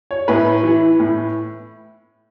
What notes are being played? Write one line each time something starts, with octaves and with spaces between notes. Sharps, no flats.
C#5
A2 B4
E3
A2